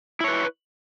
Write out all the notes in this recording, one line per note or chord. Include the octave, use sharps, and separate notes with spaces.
E4 B4 C#5